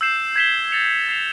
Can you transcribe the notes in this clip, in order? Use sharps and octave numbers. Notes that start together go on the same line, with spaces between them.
E6 G6 C7 E7
G#6 B6 E7 G7
A6 C#7 F7
G#6 C7 F7